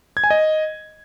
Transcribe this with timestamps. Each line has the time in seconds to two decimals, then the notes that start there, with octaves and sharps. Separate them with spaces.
0.17 G#6
0.24 G#5
0.30 D#5